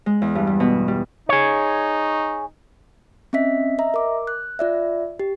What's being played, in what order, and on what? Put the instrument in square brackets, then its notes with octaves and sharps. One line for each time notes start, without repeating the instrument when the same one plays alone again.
[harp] G#3
E2
G2
G3
B2
G3
[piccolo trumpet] D#4 [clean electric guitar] G#4 C#5
[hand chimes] C4 C#4 D#5 E5 B6
D#5 E5 A#5
A#4 D6
F#6
F4 D5 E5
G4